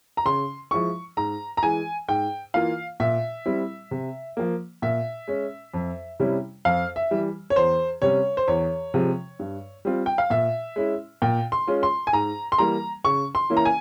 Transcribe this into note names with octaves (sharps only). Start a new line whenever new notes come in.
A#5
C#3 C6
F3 G#3 E4 C#6
G#2 A#5
A#5
E3 G#3 G#5
G#2 G5
E3 A#3 F4 F5
A#2 E5
G3 C4 E4
C3
F3 A#3
A#2 E5
G#3 C#4
F2
C3 G3 C#4 E4
F2 F5
E5
E3 G3
C#5
E2 C5
C3 G3 C#4 C#5
C5
E2 C#5
C3 F3 G#3
G2
G3 C4 F4
G5
F5
A#2 E5
G#3 C#4 E4
A#2 G5
C6
G#3 C#4 F4
C6
G#5
G#2 A#5
C6
E3 G3 A#3 A#5
C#3 C#6
C6
E3 A#3 C#4 E4
A#5
G#5